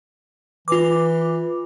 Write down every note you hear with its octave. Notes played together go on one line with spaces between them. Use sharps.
E3 F4 D6